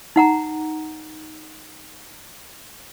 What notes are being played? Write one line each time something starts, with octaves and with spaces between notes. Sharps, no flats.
D#4 F#5 A#5